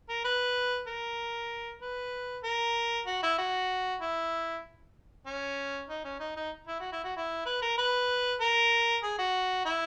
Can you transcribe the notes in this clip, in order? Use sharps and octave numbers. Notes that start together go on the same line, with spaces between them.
A#4
B4
A#4
B4
A#4
F#4
E4
F#4
E4
C#4
D#4
C#4
D#4
D#4
E4
F#4
E4
F#4
E4
B4
A#4
B4
A#4
G#4
F#4
E4